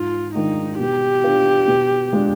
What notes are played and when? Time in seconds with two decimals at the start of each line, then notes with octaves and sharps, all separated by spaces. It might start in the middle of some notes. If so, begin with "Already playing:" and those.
Already playing: G#2 F4
0.35 D#3 G#3 D4 D#4 F4
0.79 B2 G4
1.24 B3 D4 F4
1.68 B2
2.13 G#3 D4 F4